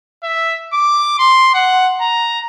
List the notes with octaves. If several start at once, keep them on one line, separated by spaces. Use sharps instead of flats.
E5
D6
C6
F#5
A#5